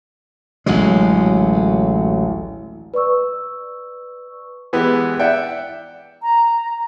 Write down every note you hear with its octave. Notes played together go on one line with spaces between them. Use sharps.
A1 D2 F#3 G#3
B4 D5 C#6 E6
E3 G#3 B3 G4
D5 E5 F#5 G5
A#5